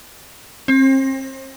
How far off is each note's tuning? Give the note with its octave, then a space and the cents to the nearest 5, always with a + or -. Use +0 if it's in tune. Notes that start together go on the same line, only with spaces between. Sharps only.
C4 +35